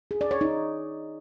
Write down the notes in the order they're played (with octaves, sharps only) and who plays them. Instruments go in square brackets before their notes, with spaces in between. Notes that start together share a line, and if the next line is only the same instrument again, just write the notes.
[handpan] G#4
D5
C#5
D#4